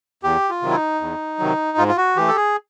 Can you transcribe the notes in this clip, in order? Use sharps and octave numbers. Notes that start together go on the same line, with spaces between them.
E2 G4
F4
C3 D#3 F#3
E4
D#4
E2
C3 D#3 F#3
G#2 F4
F4
F#4
E3 A3 G4
A4
G#4